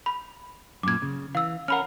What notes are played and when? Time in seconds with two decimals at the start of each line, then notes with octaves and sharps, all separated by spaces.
0.06 B5
0.83 F#2 A#2 D6 G#6
1.02 C#3
1.35 E3 F5 E6
1.68 C#4 A#4 F#5 B5 F6